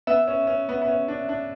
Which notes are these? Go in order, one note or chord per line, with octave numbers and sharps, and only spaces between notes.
B3 E5
C#4
C#4
B3
B3
C#4
D4
D4